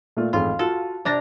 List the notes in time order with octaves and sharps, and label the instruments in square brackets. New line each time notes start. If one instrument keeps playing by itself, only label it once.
[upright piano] A#2 A3 F4
[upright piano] A1 F2 G#2 [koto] F4
[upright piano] F4 F#4 [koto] A4
[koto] C3 D4 A#5 [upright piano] D5 A6